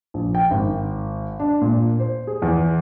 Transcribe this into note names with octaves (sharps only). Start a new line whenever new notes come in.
A#1
G5
G#1
D4
A#2
C5
G#4
E2